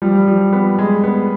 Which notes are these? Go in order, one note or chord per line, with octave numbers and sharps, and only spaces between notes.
F3 G3
F3
B3
G#3
B3